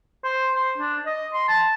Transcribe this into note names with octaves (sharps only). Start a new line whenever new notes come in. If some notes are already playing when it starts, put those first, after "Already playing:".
C5
C5
D4
D#5
C6
A5